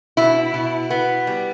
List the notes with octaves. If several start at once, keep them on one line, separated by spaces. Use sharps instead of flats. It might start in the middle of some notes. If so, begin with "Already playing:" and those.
B2 E4
B2
B3
G3